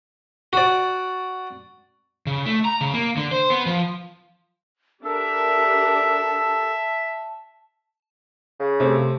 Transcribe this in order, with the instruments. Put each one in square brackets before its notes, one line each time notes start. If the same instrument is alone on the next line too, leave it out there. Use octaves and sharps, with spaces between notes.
[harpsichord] F#4 D5
[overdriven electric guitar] C#3
A3
A#5
C#3
A#3
D3
C5
B3
F3
[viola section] D4 G4 A#4 [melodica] A4 [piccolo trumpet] E5 [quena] A5
[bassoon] C#3
[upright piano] C3 A3 C4